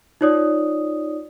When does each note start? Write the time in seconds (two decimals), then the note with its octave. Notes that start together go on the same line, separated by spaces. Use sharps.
0.21 D#4 F4 C#5 D5 D#6